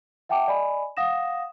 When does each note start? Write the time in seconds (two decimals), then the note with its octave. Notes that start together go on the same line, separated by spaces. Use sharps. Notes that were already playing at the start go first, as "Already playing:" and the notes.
0.29 E5 F#5 G5 A5 D6
0.48 D5 D#5 G#5 B5
0.97 F5 F#5 D#6 A#6 E7